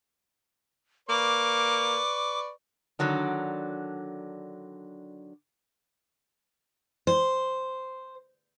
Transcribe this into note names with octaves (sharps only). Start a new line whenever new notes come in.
A#3 B4 D5 C#6 D6
D3 D#3 F#3 D4
C5